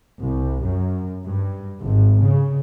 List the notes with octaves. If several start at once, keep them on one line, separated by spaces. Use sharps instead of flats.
C2
F#2
G2
G#1
C#3